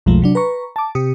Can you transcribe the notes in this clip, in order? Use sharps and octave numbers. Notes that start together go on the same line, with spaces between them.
B1 F2 B2 F3 G#3 A3
C3 F#3 D4
B4 A#5 C#6
A5 D6
C3 G4 D#6 C#7